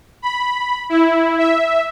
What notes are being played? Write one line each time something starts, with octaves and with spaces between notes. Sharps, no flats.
B5
E4
E5